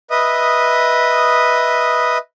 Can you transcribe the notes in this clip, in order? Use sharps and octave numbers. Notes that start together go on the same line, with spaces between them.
B4 D#5 E5 D#6